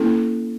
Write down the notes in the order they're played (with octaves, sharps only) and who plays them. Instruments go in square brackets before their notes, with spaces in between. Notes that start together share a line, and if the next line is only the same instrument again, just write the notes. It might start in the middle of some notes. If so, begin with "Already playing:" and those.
Already playing: [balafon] A#3 C#4 E4 A4